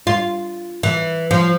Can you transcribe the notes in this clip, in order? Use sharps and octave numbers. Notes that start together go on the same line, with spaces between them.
F4
E3
F3